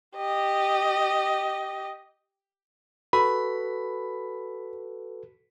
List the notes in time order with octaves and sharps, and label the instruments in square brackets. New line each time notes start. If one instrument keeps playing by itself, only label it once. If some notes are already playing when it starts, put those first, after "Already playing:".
[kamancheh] G4 D#5
[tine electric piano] F#4 A4 B4 [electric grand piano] B5